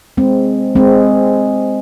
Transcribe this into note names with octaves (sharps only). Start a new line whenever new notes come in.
G#3 C4
G#3 C4